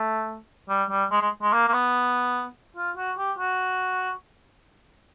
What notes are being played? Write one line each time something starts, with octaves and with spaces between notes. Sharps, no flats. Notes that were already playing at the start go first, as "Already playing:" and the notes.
Already playing: A3
G3
G3
G#3
G#3
G#3
A#3
A#3
B3
F4
F#4
G4
F#4